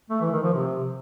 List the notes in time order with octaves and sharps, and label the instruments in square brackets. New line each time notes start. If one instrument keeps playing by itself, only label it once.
[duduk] A3
E3
D#3
F3
C3